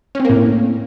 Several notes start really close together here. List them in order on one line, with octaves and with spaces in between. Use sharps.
C#4 C4 A#3 A2